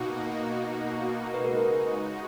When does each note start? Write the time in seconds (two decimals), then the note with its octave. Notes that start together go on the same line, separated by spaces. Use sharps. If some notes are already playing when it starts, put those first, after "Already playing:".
Already playing: B2 A#3 D#4 F#4
1.34 C#3 G#3 D#4 F#4 B4
1.45 A#4
1.55 B4